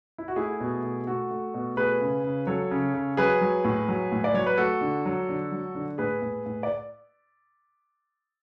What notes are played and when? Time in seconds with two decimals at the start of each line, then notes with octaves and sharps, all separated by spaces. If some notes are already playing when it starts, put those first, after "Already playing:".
0.18 E4
0.28 F#4
0.36 A3 E4 G#4
0.60 B2
0.83 A3
1.07 A3 F#4 A4
1.31 A3
1.54 B2
1.77 A3 G#4 B4
2.01 C#3
2.24 C#3
2.47 F#3 A4 C#5
2.71 C#3
2.94 C#3
3.17 F#3 G#4 B4
3.41 F#3
3.64 A2
3.88 F#3
4.12 A2
4.24 D5
4.34 F#3 C#5
4.46 B4
4.57 A3 F#4 A4
4.81 D3
5.05 F#3
5.29 D3
5.52 F#3
5.75 D3
5.98 A2 G#4 B4
6.22 A2
6.46 A2
6.63 D5